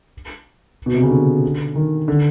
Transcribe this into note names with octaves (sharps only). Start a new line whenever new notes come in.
B2
C3
C#3
D3
D#3
D3